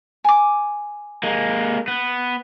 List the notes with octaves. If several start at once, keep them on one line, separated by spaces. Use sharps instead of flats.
G#5 D6
G#3 A#3
B3